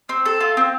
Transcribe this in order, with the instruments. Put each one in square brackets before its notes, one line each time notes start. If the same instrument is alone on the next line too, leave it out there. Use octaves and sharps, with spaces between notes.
[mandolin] C4
A4
F4
C4